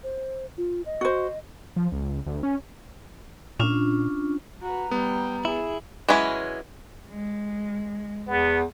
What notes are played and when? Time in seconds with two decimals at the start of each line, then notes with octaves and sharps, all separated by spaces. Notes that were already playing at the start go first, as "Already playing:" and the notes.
0.04 C5
0.57 F4
0.86 D#5
1.01 F#4 C5
1.76 F3
1.92 C#2
2.26 D2
2.43 C#4
3.60 A#2 C#4 D4 F4
4.62 F#4 B4 A#5
4.91 G3 B3 G5
5.45 E4 G#4
6.08 E3 F#3 G#3 C#4 E4
7.08 G#3
8.27 E2 B3